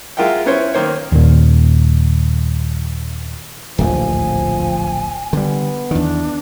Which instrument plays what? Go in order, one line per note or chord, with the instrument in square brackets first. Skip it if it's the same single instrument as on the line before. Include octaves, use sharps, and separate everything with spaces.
[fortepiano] G#3 F4 A#4 E5 F#5 G5
B3 C#4 E4 C5 C#5
D#3 A#3 C5 C#5
[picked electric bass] D#2 A#2
[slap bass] D1 A#1 D#2 [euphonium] F3 [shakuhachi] G#5
[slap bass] D3 G3 [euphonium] B3
[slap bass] E2 D#3 [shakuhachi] D4